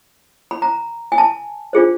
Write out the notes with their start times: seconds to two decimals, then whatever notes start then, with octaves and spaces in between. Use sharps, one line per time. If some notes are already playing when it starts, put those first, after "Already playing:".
0.51 B5
0.62 A#5
1.12 G#5
1.18 A5
1.73 D4 F4 G#4 C5